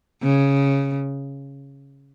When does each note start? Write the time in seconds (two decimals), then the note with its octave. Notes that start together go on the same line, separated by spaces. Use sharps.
0.23 C#3